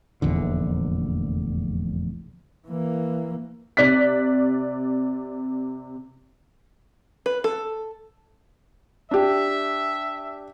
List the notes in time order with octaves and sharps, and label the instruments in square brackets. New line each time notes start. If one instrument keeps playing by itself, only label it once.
[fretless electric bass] F1 A#1 E2 D3
[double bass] E3 A#3
[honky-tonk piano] C3 D5 F#6 B6
[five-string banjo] B4
A4
[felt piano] D4 G4 [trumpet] E5